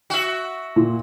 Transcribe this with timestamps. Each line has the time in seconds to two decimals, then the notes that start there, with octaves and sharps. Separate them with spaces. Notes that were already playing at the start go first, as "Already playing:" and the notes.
0.10 F#4 E5
0.76 A#2